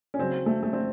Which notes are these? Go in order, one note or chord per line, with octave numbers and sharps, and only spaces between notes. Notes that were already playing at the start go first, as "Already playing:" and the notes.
C#4
C#3 F#3 C4
A3
A3
C4